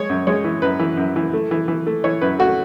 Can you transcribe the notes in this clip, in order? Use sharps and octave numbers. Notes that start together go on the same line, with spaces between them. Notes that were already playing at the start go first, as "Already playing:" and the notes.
Already playing: G#3 C#5
F#2
G#3 C#5
E3
F#2 B4
E3
F#2
E3
A3
E3
E3
A3
E3 C#5
F#2 B4
A3 F#4